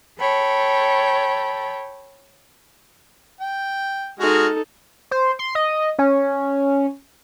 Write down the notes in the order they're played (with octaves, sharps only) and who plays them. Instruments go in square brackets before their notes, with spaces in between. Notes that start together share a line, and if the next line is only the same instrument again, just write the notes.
[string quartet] A4 C#5 G5 B5
[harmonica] G5
[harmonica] G#3 F#4 F6 [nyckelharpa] D#4 A4
[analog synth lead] C5
C6
D#5
C#4